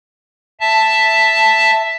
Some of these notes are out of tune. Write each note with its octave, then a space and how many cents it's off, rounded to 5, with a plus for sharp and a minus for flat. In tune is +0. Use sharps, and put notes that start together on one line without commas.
E5 +0 A5 +0